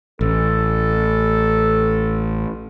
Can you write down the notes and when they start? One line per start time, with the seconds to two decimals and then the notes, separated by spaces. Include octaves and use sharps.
0.21 A1 A4